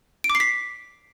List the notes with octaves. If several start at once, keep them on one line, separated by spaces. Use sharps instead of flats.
D7
D6
C7
B6